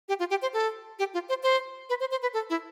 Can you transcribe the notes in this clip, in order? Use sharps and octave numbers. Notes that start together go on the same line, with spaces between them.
G4
F4
G4
C5
A4
G4
F4
C5
C5
B4
C5
C5
B4
A4
E4